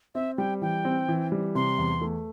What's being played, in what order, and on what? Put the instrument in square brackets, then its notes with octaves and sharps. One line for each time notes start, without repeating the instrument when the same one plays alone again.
[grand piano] C4 [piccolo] E5
[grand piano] G3 [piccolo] G5
[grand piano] E3 [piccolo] G5
[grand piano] C4
E3
G3
[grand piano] C3 [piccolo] C6
[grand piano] E2
A3